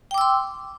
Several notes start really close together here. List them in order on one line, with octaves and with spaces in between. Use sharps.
G5 D6 E6 C6